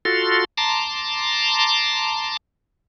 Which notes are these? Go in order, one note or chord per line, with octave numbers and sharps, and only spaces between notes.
F4 F#4 A4 C6
A5 A#5 C6 D6